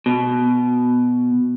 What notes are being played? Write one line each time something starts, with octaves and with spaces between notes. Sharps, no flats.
B2